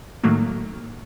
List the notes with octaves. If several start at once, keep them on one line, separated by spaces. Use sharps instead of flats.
A2 D#3 F#3 A3 A#3